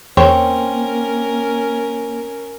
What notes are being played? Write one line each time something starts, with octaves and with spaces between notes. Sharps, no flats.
E2 A#3 C4 C#4 A#4 C#5